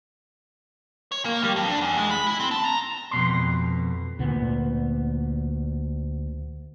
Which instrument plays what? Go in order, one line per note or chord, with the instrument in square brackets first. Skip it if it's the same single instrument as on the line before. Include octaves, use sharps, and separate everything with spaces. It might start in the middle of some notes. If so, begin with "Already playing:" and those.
[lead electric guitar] C#5
A#3
G3
F2
D4
E2
G#3
B5
E4
C4
A5
A#5
[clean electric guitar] F2 B2 C6
[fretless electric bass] D2 A#2 B3